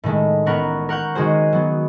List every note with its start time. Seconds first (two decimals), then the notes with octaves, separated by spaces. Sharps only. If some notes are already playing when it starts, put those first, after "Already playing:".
0.04 A2 D#3 G#3 A3
0.46 A1 B3 A#4 B4 F#5 C#6
0.89 A#4 F#5 C#6 G6
1.15 D#3 G#3 F#4 G#4 C5
1.53 F#3 B3